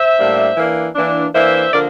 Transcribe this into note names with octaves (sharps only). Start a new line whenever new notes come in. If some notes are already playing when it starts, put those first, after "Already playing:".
Already playing: C5 E5
A2 G3 A#3 D4
E3 A#3 D4
E3 A#3 D4
E3 A#3 D4 C5 E5
D3 F3 A#3 D4 A#4 D5